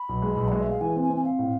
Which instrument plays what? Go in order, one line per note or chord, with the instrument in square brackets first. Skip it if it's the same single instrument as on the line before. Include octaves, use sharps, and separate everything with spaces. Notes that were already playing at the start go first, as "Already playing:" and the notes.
Already playing: [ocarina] B5
[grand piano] B1
G#3
B1
[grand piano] G#3 [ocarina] D5
[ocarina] E5
[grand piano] G#3 [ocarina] F5
[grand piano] E3 [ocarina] G#5
[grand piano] C4
[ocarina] G#5
[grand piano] C4
[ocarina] G#5
[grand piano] C4 [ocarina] F5
[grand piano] A2